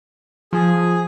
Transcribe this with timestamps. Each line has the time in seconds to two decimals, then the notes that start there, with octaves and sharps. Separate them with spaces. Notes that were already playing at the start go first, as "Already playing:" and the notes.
0.53 F3 G#4